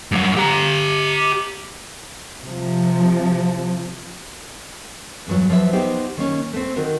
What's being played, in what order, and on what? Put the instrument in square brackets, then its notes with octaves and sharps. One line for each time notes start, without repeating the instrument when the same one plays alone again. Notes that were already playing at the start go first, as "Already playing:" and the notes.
[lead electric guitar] G2 F#3
G4 A#5
[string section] C3 F3
[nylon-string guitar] E2 G2 F#3
F3 F#3 B4 C5 E5
B3 D#4 G4 C5
D#3 A#3 C#4
A3 C4
D#3 F#4 A#4